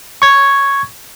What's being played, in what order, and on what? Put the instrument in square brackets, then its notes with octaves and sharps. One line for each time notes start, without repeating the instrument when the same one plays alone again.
[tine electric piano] C#6 G#6